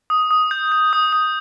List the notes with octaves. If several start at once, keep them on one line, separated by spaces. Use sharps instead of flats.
D#6
D#6
G6
G6
D#6
D#6